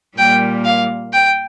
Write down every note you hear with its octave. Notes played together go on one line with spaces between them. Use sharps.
A#2 G3 A#3 G5
F5
G5